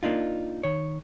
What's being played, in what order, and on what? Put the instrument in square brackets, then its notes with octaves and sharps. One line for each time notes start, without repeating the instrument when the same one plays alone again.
[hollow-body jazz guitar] A#3 D4 D#4 F4
D#3 C#5